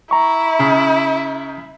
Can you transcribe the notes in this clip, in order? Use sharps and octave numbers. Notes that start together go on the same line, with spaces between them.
E4 A#5 C#6
C#3